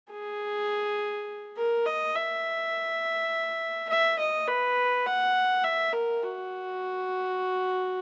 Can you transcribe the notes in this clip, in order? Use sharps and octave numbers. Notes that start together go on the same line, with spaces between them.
G#4
A#4
D#5
E5
E5
D#5
B4
F#5
E5
A#4
F#4